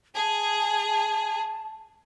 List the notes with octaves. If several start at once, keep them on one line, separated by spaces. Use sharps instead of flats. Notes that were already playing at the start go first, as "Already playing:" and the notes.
G#4 A5